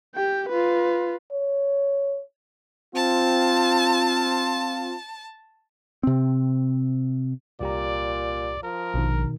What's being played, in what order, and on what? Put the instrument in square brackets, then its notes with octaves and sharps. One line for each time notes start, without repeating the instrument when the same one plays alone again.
[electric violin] G4 G5
F4 B4
[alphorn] C#5
[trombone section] C4 F4 [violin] A5
[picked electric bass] C3 C4
[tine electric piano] C2 G4 A#5 [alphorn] A#2 [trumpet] D5
[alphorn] F3 [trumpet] A#4
[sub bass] A#1 [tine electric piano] B2 D#3